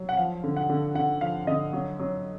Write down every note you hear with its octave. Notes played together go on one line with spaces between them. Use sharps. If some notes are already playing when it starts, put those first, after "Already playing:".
Already playing: F#3
F#5
F3 F5
D3
F#5
D3
D3 F#5
F3 F5
D3 D#5
F#3
F#3